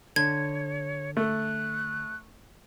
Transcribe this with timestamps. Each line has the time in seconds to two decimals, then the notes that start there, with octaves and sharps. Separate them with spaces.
0.16 D3 C#5 G#6
1.17 A3 F#6